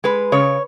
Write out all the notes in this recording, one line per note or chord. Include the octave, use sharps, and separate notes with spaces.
G#3 B4
C#3 C#5